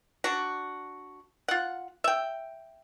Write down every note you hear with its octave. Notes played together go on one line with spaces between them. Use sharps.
D4 F#4
F4 F#5
E5 G5